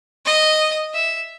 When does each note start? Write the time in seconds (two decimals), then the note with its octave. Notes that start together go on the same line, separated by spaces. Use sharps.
0.25 D#5
0.94 E5